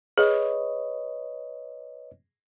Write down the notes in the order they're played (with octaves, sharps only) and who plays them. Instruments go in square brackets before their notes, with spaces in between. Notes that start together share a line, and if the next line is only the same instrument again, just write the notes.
[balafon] G#4 [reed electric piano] B4 C#5 D#5